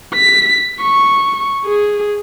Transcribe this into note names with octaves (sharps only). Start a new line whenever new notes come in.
B6
C#6
G#4